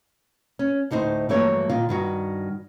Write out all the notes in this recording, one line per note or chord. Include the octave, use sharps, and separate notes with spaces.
C#4
D2 A2 D#4 C5
G2 E3 F#3 A3 A#3 C#5
A#2 D#3 F4
G2 D#3 F#4